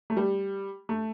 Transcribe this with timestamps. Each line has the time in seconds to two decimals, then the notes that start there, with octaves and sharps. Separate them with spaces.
0.10 A3
0.17 G3
0.89 A3